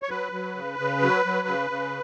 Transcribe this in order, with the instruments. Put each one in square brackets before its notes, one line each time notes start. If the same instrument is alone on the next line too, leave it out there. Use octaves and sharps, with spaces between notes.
[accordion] C#5
F#3 B4
F#3
C#3
C#3
F#3
F#3
C#3
C#3